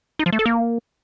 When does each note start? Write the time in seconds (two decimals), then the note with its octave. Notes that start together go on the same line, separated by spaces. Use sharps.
0.19 D#4
0.26 F3
0.33 A3
0.39 A4
0.46 A#3